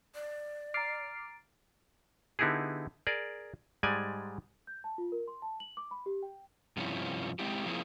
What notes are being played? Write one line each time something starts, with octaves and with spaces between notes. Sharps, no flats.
D5
A#5 D6 F6 A6 C7 D7
D3 B3 D#4 E4 G4 G#4
G#4 A#4 D5
G#2 G3 G#3 D5 G#5
G6
A5
F4
A#4
C6
A5
F#7
D6
B5
G4
G5
G2 C3 F3 C#4 E4
G#3 C4 E4 G4
F3 A#3 C4 E4 G#4